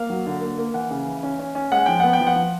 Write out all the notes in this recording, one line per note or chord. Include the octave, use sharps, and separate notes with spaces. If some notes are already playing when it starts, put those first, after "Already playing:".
Already playing: A#3 F5
F#3
D3
A#3
A#3
E3 F#5
C#3
E3
C#4
C#4
C#4
G#3 F#5
F3 G5
B3 F#5
G5
F3
F#5
F3